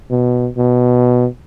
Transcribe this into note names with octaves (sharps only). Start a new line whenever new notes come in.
B2
B2